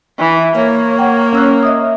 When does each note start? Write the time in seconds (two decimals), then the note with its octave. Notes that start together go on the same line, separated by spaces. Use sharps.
0.18 E3
0.56 A#3 C#5
0.99 F#5 G5
1.33 C#4 E6 F#6
1.63 D#5 E5 D#6